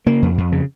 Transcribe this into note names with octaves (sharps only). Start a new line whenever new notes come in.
C#3 A#3
F2
F2
C#3